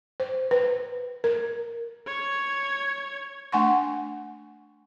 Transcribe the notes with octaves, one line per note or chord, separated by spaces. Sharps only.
C5
B4
A#4
C#5 G#6
A3 D4 F#5 G#5 C6 C#6